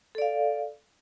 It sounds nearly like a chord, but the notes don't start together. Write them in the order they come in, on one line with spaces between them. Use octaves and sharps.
A4 D5 F5